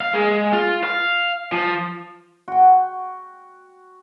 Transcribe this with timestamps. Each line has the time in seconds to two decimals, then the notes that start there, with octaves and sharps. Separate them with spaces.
0.01 F5
0.14 G#3
0.53 F4
0.84 F5
1.52 F3
2.48 F#4 G5